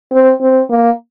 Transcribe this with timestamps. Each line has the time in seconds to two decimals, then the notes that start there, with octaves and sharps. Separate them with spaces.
0.12 C4
0.41 C4
0.70 A#3